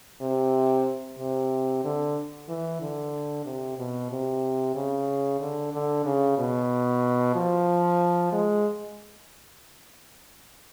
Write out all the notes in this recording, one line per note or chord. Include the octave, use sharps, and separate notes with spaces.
C3
C3
D3
E3
D3
C3
B2
C3
C#3
D3
D3
C#3
B2
F3
G#3